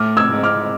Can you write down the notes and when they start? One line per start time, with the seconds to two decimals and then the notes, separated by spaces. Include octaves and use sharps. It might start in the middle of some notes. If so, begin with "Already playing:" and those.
Already playing: A2 D6 F6
0.17 E6 G#6
0.30 G#2
0.43 D6 F6